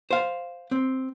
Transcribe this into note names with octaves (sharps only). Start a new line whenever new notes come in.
C5 F5
C4